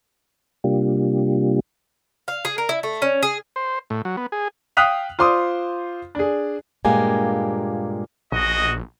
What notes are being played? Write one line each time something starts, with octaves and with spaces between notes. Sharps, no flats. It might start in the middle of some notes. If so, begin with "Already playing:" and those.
C3 G3 A#3 D4 F4 G4
F5
G#4
A#4
E4
A3
C#4
G#4
C5
A2
F#3
B3
G#4
F5 G5 D#6 F#6 B6 F7
F4 C5 C6 D6 D#6
D4 G#4
G2 A#2 G#3 A#3 G4 G#5
A#1 F#4 G#4 D#5